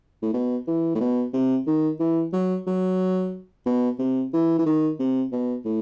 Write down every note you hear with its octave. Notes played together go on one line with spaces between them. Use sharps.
A2
B2
E3
A2
B2
C3
D#3
E3
F#3
F#3
B2
C3
E3
E3
D#3
C3
B2
A2